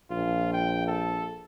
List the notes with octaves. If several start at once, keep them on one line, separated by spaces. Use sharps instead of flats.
A#1 F4
G5
A4